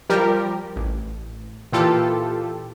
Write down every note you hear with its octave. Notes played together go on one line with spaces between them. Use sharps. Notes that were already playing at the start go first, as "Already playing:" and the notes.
F3 G3 G4 A#4
A1
A#2 E3 F4 G4 A4